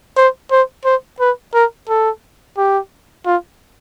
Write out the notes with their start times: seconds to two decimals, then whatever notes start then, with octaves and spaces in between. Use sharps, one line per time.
0.17 C5
0.51 C5
0.85 C5
1.20 B4
1.54 A#4
1.89 A4
2.58 G4
3.26 F4